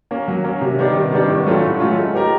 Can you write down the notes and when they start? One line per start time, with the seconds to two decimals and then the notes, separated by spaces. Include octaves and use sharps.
0.11 A#3 C#4
0.28 F#3
0.44 A#3 C#4
0.61 C3
0.79 D#3 G3 B3 D4
0.95 C3
1.12 D#3 G3 B3 D4
1.28 A2
1.46 F#3 A3 C#4 F4
1.64 A2
1.80 F#3 A3 C#4 F4
1.97 G#3
2.14 B3 D#4 G4 A#4